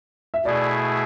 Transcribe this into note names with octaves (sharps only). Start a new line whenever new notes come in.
E5
B2 A3 E4 G#4 D5